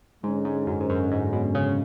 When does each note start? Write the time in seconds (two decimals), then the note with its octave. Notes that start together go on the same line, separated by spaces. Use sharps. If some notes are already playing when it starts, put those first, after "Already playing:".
0.23 G#2 D3 G#3 C#4
0.45 G#2
0.67 F#2
0.81 G#2
0.90 F#2
1.11 G#2
1.33 B2
1.55 C#3